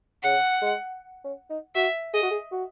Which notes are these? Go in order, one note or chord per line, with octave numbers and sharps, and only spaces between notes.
C#3 F#5
G#3
C#4
D#4
F#4 E5
G#4 D#5
F#4
G#4
F#4